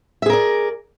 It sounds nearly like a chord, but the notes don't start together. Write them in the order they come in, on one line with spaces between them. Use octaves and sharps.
E5 G#4 A#4 D5